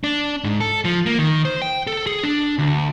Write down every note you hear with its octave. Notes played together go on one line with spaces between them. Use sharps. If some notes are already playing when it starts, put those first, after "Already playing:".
D4
G#2
A4
F3
A#3
D#3
C5
G5
A4
G#4
D4
D2